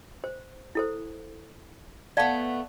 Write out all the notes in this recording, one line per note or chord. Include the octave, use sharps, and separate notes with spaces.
C5
E4 A4 C5
A3 B3 D5 F5 A5